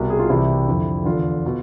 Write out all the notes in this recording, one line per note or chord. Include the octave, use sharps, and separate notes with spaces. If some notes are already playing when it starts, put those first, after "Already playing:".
Already playing: C2 B2
G#4
F4
C2 C3 E3 E4
F2 D3
E2 D3 F4
B2